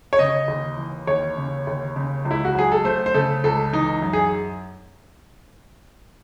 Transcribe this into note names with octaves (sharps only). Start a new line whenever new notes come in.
C#5
C#3 D#5
D#2
E3
D#2 C#5
C#3
D#2
C#3
C#2
E4
F#4
F#3 G#4
A4
A3 C5
C5
C#3 A4
C#2 A4
E3 D#4
F#2
G#4